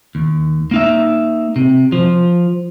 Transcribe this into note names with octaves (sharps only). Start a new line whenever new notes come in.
D#2
A#3 D#4 E5
C3
F3